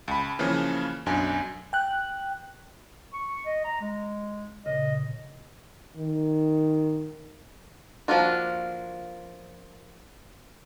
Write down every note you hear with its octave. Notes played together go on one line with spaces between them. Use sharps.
C#2 B5
C#3 E3 F3 A#3 C#4
B1 F#2 D4 G#5
G5 F#6
C#6
D#5
A#5
G#3
A#2 C#3 D#5
D#3
F3 A#3 D4 F4 F#4